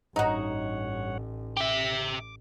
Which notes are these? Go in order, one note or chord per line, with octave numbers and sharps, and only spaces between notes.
A1 G2 D#4 F#4 C#5 F#5
G4 E5 D6